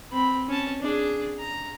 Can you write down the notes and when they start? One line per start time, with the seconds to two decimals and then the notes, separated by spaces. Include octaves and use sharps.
0.12 C4 B5
0.48 C#4 A5
0.81 D4 G#4
1.40 A#5